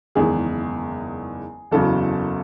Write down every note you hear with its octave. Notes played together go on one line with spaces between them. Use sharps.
F#1 E2 D#3 G#3 G#4
F#1 E2 C#3 F#3 A4